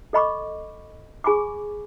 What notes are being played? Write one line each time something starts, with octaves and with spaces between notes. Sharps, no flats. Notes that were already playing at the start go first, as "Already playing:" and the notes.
A4 D#5 B5 C#6 D6
G#4 G#5 B5 C#6 D6